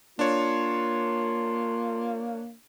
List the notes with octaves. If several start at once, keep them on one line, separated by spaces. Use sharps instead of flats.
A#3 D4 F4 C#5